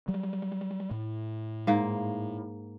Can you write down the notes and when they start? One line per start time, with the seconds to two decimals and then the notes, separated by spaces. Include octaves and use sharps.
0.08 F#3 G3
0.91 A2
1.67 G#2 A#3